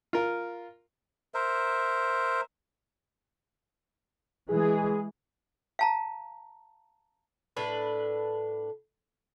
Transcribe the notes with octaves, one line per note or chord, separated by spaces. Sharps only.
F4 A#4
A#4 C5 E5
E3 G#3 G#4
F5 A5 A#5
A2 D4 B4